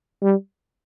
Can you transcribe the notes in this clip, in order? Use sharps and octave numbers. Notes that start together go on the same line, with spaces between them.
G3